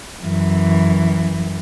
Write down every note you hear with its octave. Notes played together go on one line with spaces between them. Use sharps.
F#2 E3